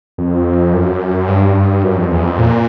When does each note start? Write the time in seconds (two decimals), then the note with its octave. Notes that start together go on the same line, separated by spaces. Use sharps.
0.18 F2
0.73 F#2
1.28 G2
1.83 F#2
1.97 F2
2.11 E2
2.24 F2
2.39 A#2